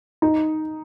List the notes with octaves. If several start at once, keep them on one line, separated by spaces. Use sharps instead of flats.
D#4